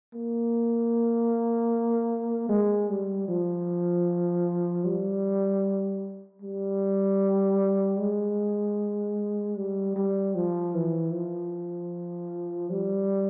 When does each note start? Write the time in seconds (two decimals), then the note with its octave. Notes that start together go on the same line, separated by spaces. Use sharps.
0.14 A#3
2.50 G#3
2.90 G3
3.28 F3
4.85 G3
6.42 G3
7.99 G#3
9.56 G3
9.96 G3
10.35 F3
10.75 E3
11.13 F3
12.70 G3